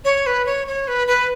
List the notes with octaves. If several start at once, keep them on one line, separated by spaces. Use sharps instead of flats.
C#5
B4
C#5
C#5
B4
B4